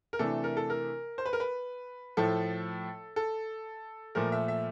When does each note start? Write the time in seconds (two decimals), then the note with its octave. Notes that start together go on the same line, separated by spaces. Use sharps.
0.13 A#4
0.19 C3 E3 A3 D4 A4
0.44 A#4
0.57 A4
0.70 A#4
1.18 C5
1.26 B4
1.33 A#4
1.40 B4
2.17 A2 F3 A3 A4
3.16 A4
4.15 A#2 F3 A3 A#4
4.32 E5
4.48 E5